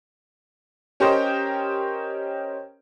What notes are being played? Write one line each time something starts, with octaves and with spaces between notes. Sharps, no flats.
C#4 G4 A#4 C5 D#5 G5